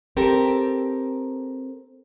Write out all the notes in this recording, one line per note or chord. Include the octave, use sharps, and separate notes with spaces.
C4 G4 A4 A#4